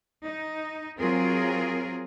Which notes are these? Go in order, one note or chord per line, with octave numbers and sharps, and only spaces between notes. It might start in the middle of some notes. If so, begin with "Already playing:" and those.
D#4
F#3 C4 F4 G#4 A#4